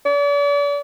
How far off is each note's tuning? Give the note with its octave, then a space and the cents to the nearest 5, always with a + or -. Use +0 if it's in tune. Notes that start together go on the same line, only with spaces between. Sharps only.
D5 -40